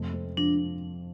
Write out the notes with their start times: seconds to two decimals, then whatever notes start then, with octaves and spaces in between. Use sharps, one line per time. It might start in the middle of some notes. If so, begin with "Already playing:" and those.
Already playing: F2 C3 A3
0.14 C4
0.37 F3 D4